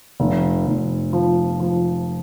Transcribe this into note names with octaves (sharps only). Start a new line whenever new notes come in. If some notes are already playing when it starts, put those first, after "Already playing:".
F1
F1
F3
F3